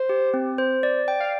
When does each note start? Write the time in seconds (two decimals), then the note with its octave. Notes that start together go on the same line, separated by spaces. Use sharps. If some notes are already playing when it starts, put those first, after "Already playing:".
Already playing: C5
0.09 G4
0.34 C4
0.58 C5
0.83 D5
1.08 G5
1.20 F5